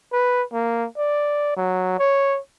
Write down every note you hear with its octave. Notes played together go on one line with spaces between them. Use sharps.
B4
A#3
D5
F#3
C#5